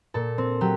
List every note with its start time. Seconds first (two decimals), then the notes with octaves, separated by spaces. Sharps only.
0.14 A#2 A4
0.38 C4
0.61 F#3 G4